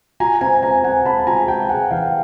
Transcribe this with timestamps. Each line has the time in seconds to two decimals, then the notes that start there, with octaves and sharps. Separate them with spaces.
0.20 F4 G#5 A#5
0.41 C4 G#5 A#5
0.63 C4 G#5 A#5
0.84 C4 F#5 G#5
1.05 C4 A5 B5
1.27 F4 G#5 A#5
1.48 F4 G5 A5
1.69 G#3 F#5 G#5
1.91 E3 F5 G5